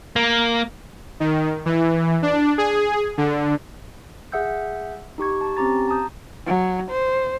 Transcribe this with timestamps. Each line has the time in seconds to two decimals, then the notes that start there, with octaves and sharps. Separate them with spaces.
0.16 A#3
1.20 D#3
1.66 E3
2.22 D4
2.58 G#4
3.18 D3
4.32 G#4 E5 F#5 E6 G6
5.18 D#4 G4 C#6 G#6
5.41 A5 C#6
5.57 C4 C#4 G4 A#5 A6
5.88 A5 A#5 D#6 G6
6.46 F#3
6.91 C5